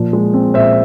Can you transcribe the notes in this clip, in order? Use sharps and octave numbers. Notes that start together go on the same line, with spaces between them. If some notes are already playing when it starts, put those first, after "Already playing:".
Already playing: A#2 F3
G#3
C4
A#2 C5 E5